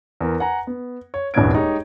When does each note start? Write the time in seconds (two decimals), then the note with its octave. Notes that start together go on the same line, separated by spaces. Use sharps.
0.21 E2 A#4
0.40 F#5 G#5 A#5
0.67 B3
1.14 C#5
1.34 D#1 E2 G2 C#5 G#6 D7
1.53 G#3 D#4 G4 C#5